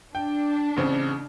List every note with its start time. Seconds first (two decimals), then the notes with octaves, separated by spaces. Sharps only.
0.15 D4 G5
0.77 A1 C#3 C4